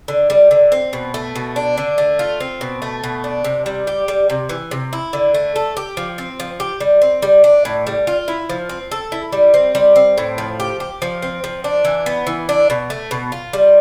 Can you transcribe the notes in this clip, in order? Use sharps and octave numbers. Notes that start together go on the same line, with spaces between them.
D3
G3
D3
C4
B2
A3
B2
D4
D3
A3
F4
C4
B2
A3
B2
D4
C3
G3
G4
G3
C3
E3
C3
E4
D3
A3
A4
G4
F3
C4
F3
G4
G3
C4
G3
D4
A2
G3
F4
E4
F3
C4
A4
E4
G3
C4
G3
C4
A2
F3
G4
G4
F3
C4
F3
D4
E3
B3
E3
D4
B2
A3
B2
F4
G3